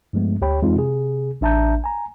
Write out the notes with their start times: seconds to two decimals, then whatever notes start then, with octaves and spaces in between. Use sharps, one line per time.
0.13 G2 F3 G#3 A3 B3
0.41 D2 G4 C#5 G5 B5
0.62 F2 E3 G#3 C4 D#4 F4
0.76 C3 G#4
1.41 A1 D4 E5 A5 A#5 G6
1.84 G#5 A#5